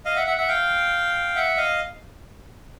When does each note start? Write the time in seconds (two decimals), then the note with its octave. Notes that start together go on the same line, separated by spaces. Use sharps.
0.05 D#5 F5
0.16 E5 F#5
0.26 E5 F#5
0.38 E5 F#5
0.48 F5 G5
1.36 E5 F#5
1.57 D#5 F5